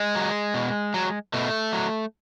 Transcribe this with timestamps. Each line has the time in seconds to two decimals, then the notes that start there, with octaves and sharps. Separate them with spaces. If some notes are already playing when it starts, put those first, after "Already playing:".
Already playing: G#3
0.15 F#3
0.54 B2
0.94 F#3
1.34 B2 A3
1.73 F#3